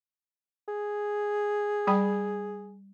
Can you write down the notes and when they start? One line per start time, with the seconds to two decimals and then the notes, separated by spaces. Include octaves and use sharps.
0.68 G#4
1.87 G3 G5 B5